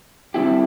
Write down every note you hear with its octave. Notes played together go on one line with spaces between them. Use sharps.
D3 G3 C4 E4 G4